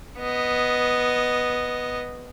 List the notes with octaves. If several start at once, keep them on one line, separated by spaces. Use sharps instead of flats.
B3 D#5